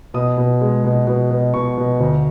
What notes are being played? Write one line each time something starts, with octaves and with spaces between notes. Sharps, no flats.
B2 D#6
B2
G#3
B2
B2
B2
B2 C#6
B2
D2